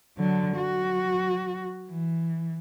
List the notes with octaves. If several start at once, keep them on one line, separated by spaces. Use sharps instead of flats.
D3 F#3
F#3 F#4
E3